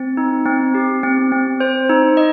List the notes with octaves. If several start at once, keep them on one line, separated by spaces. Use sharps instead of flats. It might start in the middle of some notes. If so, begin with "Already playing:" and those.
Already playing: C4
D#4
C4
G4
C4
C4
C5
D#4
D#5